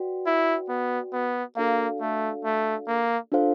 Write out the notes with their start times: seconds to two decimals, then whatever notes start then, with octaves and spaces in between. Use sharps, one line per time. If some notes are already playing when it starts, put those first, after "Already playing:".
Already playing: F#4 B4 D5 G5
0.26 E4
0.69 B3
1.13 B3
1.57 A#3 D4 F#4 A4 D5 F5
2.00 A3
2.45 A3
2.87 A#3
3.32 D4 F4 A4 C5 F5